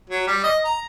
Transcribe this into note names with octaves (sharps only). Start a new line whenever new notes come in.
F#3
G3
D#5
A#5